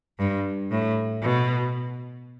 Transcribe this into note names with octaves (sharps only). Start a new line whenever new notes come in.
G2
A2
B2